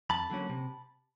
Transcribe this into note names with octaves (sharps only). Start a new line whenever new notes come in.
F2 A5 B5
D3 F#3 A#3 C#4
C3